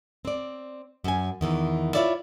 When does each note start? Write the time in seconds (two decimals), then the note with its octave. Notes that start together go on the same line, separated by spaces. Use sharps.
0.25 C4 D5
1.04 F#2 G#5
1.41 E2 D#3 E3
1.94 E4 F4 C#5 D5 E5 F5